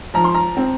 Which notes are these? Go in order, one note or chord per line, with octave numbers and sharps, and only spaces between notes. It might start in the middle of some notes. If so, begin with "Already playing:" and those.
F3 A#5
C6
A#5
C4